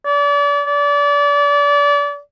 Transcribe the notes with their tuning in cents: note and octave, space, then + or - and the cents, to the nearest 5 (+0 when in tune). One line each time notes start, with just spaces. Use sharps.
D5 -35
D5 -30